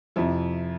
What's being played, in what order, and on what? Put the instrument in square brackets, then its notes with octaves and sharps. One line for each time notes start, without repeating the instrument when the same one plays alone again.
[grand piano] F2 C3 F3 E4